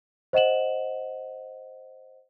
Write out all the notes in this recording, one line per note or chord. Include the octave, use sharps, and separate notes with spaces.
C5 D#5 F#5 E7 F#7